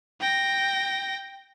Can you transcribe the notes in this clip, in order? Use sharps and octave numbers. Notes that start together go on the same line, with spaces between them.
G5 A#6